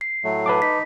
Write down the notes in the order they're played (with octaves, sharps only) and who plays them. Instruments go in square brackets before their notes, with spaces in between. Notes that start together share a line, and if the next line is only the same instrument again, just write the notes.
[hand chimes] C7
[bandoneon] A2 F#3 A3
[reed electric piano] B4 A5 D6
[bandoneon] D#4 [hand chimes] B6